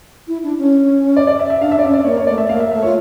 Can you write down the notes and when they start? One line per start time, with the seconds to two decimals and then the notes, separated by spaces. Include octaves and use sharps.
0.28 E4
0.43 D4
0.58 C#4
1.16 D5
1.27 D5
1.39 E5
1.50 E5
1.61 D4 F5
1.72 E5
1.79 D5
1.83 C#4 E5
1.94 D5
1.97 C#4
2.05 A#3 C#5
2.17 C#5
2.27 A3 D5
2.38 E5
2.49 A#3 F5
2.60 E5
2.71 A3 E5
2.82 F4 C#5